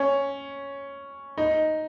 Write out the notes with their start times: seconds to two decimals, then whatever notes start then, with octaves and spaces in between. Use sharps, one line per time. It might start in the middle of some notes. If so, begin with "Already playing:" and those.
Already playing: C#4
1.38 D#4